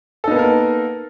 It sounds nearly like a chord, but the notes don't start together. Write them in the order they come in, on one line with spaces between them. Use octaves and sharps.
A4 D#4 B3 A#3 A#4